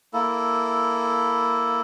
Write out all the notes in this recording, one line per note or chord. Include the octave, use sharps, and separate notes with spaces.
A#3 E4 A4